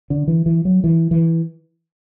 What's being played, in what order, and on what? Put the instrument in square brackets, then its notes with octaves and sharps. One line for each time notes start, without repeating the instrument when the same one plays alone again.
[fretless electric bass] D3
E3
E3
F#3
E3
E3